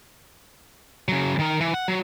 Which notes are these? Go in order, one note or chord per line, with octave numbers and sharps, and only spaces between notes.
C#3 F#3
D#3 A#4
E3
F#5
F#3